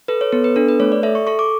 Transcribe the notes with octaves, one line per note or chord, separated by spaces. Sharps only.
A4 B4
C#5
B3 A4
B4
D4 A4
B4
A3 C#5
D5
A4 E5
C#6
A4 C#6
D6